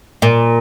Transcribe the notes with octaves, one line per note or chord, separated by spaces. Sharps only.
A#2